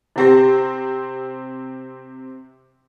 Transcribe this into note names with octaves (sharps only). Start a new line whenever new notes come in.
C3 C4 E4 G4 A#6